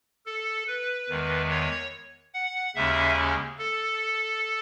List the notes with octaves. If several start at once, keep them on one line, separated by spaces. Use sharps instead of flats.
A4
B4
E2 D#3 G#3
C#5
F#5
D#2 C#3 G#3 C#4 E5
A4